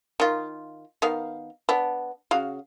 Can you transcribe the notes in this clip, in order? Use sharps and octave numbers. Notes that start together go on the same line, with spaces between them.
D#3 F4
D#3 B3 F5
B3 D4
C#3 F#4 F5